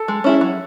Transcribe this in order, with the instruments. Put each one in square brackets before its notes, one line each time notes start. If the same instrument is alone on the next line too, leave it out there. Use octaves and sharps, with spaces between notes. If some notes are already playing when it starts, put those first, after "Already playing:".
Already playing: [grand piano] A4
[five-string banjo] G#3
C#4 E4 G#4
F#3